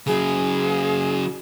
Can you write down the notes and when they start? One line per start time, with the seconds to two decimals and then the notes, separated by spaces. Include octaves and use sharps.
0.07 C#3 F#3 G#4